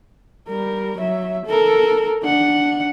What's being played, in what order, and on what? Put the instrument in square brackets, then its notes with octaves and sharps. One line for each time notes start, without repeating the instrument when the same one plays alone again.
[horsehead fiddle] G3 A#4
F#3 E5
A4 A#4
D4 F#5